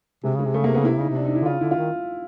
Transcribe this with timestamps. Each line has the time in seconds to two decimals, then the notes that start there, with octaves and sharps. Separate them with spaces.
0.24 C3 G#3
0.35 C#3 G#3
0.45 C3
0.54 C#3 A3
0.64 C3 A#3
0.75 C#3 B3
0.85 C3 E4
0.98 C#3 D#4
1.09 C3
1.15 D4
1.25 D#4
1.35 E4
1.42 D3
1.45 C#3 F4
1.61 D3 E4
1.71 F4
1.76 D#3